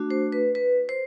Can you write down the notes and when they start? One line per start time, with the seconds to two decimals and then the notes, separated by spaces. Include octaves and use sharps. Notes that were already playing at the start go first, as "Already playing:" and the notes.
Already playing: A3 D4 F#4
0.10 C5
0.32 B4
0.55 B4
0.89 C5